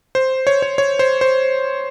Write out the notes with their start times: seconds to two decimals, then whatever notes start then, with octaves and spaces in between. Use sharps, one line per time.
0.15 C5
0.47 C#5
0.62 C#5
0.78 C#5
0.99 C5
1.21 C5